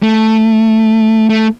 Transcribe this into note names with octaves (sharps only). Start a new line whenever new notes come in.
A3
A3